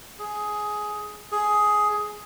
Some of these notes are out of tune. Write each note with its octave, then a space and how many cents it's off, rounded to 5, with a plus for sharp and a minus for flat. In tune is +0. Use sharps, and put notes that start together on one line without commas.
G#4 +10
G#4 +10